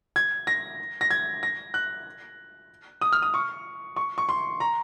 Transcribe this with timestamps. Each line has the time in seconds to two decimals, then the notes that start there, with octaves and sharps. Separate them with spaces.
0.16 G#6
0.47 A#6
1.01 A#6
1.11 G#6
1.43 A#6
1.74 F#6
3.01 D#6
3.12 F6
3.22 D#6
3.34 C#6
3.96 C#6
4.18 C#6
4.29 C6
4.60 A#5